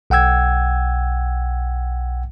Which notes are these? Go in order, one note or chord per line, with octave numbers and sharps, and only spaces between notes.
B1 F#5 G5 E6 G#6